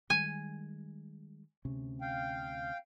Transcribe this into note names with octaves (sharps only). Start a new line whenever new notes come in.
D#3 G3 G#3 G#5
D2 C3 C#4
F5 G5